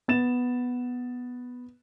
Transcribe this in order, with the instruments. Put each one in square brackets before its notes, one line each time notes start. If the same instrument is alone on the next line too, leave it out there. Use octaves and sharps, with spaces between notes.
[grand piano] B3 A6 E7